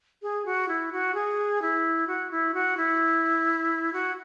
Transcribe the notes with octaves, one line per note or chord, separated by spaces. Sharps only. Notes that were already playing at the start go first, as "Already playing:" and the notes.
G#4
F#4
E4
F#4
G#4
E4
F#4
E4
F#4
E4
F#4